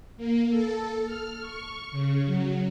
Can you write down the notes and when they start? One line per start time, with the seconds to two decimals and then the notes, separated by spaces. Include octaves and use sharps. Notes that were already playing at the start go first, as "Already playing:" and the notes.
0.17 A#3
0.50 A4
1.05 F6
1.40 C#6
1.91 C#3
2.26 F#3